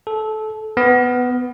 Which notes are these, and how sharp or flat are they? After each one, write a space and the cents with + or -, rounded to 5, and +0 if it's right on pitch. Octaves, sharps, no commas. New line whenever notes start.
A4 -20
B3 +10